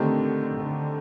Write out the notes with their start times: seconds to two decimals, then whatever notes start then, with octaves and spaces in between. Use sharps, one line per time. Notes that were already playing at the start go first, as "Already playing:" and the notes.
Already playing: D3 D#3 A3 C4 G4
0.59 D3